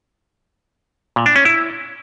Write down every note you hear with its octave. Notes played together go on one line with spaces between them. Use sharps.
A#2
D4
C#4
E4